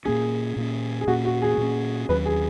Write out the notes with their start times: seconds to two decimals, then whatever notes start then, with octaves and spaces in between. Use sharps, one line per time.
0.05 A#2 A#3 C#4 G#4
0.56 A#2 A#3 C#4
1.01 G#4
1.07 A#2 A#3 C#4 F#4
1.25 F#4
1.42 G#4
1.58 A#2 A#3 C#4
2.09 D#2 D#3 F#3 C#4 B4
2.25 G#4